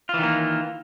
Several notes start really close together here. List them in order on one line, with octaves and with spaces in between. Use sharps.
F4 E3 D#3 A#3